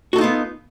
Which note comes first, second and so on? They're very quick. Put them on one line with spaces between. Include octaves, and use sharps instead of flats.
F#4 A4 D#4 F4 B3